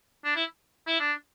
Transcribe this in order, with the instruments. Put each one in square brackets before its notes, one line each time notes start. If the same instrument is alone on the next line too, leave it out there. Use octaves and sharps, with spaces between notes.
[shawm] D4
E4
E4
D4